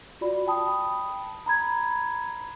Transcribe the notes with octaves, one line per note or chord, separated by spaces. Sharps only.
F4 F#4 D5 B5
G5 A5 B5 D#6
A#5 B5 G#6